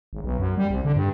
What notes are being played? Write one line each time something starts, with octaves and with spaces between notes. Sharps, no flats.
G#1
B1
F#2
G3
C2
D3
G2